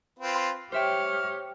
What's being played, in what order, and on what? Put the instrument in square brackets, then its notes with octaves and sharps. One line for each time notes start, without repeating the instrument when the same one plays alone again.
[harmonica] C4 F4 B4
[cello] G4 C#5 [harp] C5 E5 G5 [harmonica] F6